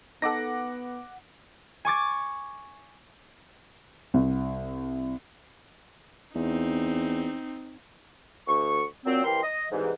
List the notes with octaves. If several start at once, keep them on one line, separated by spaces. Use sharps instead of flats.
B3 D#4 A4 F#5 D6 A#6
G#5 C#6 D6 A6
C2
E2 C4 D#4
D2 C#6
A#2 F#3 C4
C2 E3 G4 A#4 C6
D#5
C2 G#2 E3